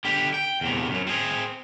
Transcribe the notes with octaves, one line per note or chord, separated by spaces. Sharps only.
D3 G4
G5
E2 C3
F#2 F#3
C4 G#4